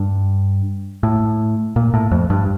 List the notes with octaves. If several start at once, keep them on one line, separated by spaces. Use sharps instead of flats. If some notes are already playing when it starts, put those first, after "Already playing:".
Already playing: G2
A2
A#2
A2
F2
G2